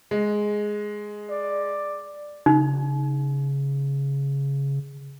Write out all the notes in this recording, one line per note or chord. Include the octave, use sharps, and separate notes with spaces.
G#3
D5
C#3 D#4